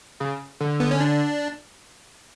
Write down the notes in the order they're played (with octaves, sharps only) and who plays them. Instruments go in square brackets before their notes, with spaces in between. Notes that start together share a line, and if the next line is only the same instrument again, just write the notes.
[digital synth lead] C#3
D3
[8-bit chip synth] B3
C#4
D4